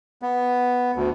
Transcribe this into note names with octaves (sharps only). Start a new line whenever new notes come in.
B3
D2